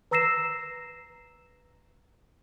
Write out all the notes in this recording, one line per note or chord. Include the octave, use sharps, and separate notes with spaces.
B4 A#5 E6 A#6 C7 E7